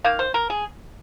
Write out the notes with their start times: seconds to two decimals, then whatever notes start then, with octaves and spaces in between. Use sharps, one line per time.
0.04 D#3 A#3 F5
0.19 C5
0.34 A#4
0.50 G#4